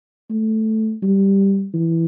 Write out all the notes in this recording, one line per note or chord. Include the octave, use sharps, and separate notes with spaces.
A3
G3
E3